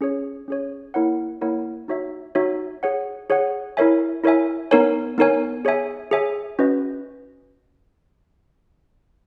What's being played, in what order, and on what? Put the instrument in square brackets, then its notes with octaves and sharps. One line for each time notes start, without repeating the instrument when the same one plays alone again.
[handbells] C#4 G#4 C#5
C#4 G#4 C#5
A#3 E4 A#4 C#5 F#5
A#3 E4 A#4 C#5 F#5
D#4 F#4 C#5 E5
D#4 F#4 C#5 E5
G#4 C#5 F#5
G#4 C#5 F#5
E4 A#4 C#5 E5 G#5
E4 A#4 C#5 E5 G#5
B3 D#4 A#4 C#5 G#5
B3 D#4 A#4 C#5 G#5
G#4 C#5 E5 G#5
G#4 C#5 E5 G#5
C#4 F#4 B4 D#5